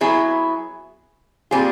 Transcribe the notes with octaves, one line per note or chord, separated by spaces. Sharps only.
F#3 B3 E4 G#4
A#2 G3 C4 F4 G#4